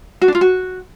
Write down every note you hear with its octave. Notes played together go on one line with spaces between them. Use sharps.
F#4
D4
F4
F#4